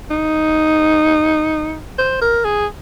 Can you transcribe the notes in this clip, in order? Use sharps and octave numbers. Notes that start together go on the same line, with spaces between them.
D#4
C5
A#4
G#4